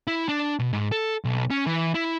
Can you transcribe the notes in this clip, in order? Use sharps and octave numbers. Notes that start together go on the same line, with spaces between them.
E4
D4
B2
G#2
A4
B1
C#4
E3
E4